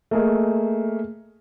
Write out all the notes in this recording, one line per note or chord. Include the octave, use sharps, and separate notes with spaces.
A3 A#3 G#4 D#5